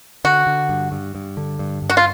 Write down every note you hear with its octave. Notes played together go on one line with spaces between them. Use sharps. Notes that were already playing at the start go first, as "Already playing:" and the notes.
D3 F#4
D3
G2
G2
G2
D3
G2
G2
F#4
F4